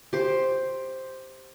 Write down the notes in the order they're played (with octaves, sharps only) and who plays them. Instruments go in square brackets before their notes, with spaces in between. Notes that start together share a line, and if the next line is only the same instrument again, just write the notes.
[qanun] G4 C5